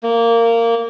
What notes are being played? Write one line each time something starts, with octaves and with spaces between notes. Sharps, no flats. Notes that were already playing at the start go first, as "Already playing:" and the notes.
A#3